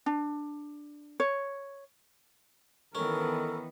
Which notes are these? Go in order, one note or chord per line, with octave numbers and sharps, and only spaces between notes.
D4
C#5
D#3 E3 B3 C#4 A4 A#4